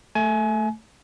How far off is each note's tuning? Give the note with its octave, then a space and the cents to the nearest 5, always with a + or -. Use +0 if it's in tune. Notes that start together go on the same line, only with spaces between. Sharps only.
A3 +0 G#5 +30